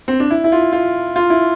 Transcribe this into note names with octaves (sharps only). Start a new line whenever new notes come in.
C4
D4
E4
E4
F4
F4
F4
E4